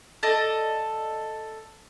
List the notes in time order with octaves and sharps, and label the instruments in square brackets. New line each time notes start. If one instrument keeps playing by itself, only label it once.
[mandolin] A4 D5 D#5